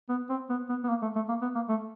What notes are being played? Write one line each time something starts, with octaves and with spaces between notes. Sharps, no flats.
B3
C4
B3
B3
B3
A#3
A3
A3
A#3
B3
A#3
A3